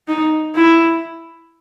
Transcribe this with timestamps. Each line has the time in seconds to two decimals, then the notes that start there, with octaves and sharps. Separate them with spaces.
0.08 D#4
0.55 E4